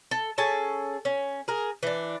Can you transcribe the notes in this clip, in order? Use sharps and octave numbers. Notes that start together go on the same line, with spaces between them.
A4
C#4 G#4 A4 A5
C#4
G#4 A#4
E3 D4